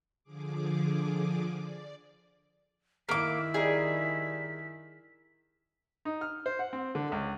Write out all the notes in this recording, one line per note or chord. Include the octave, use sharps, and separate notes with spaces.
D3 F3 G#4 D6
D5
D#3 A#3 E4 D6 B6
G3 D#4 G#4
D#4
F6
C5
F#5
C4
D3
C#2